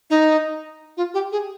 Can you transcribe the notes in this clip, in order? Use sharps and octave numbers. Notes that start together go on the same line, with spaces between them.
D#4
F4
G4
G#4